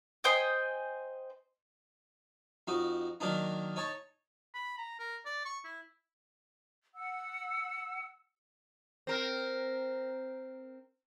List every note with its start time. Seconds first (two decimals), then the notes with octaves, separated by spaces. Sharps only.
0.24 C5 D#5 G5 G#5
2.67 F2 D#4 F#4
3.20 D#3 F#3 A#3 D4 D#4
3.76 D#4 C#5 A5 C#6
4.54 B5
4.78 A#5
4.99 A#4
5.25 D5
5.45 C#6
5.64 E4
6.95 F#5 E6
9.07 C4 A#4